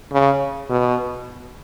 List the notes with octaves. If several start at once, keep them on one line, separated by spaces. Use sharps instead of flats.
C#3
B2